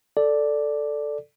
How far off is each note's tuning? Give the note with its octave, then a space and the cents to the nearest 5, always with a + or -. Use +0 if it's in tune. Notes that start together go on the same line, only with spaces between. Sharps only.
A4 +0 D5 +0